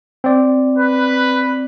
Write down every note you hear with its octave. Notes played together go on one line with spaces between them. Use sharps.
C4 D5
B4